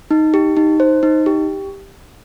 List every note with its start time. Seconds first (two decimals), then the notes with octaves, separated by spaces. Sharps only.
0.11 D#4
0.34 G4
0.57 D#4
0.80 C5
1.03 D#4
1.26 G4